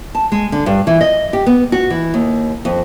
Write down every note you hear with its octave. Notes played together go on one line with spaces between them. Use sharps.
A5
G#3
D3
G2
E3
D#5
G4
B3
F#4
E3
D#2
F2